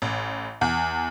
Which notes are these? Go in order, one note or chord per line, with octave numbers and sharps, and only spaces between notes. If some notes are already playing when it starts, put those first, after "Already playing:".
A1
E2